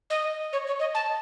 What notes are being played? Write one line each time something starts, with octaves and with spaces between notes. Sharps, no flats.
D#5
C#5
C#5
D#5
A5